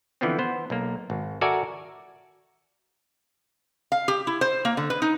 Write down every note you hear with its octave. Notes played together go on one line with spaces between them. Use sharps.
D3 E3 F3 B3 C4
B3 C5
B1 A#3
G#1
F#4 A4 A#4 D5 E5 G#5
F5
G4
E4
C5
A#3
D3
B4
D#4